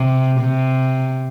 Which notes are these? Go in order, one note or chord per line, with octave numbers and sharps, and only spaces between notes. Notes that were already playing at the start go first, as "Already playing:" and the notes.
Already playing: C3
C3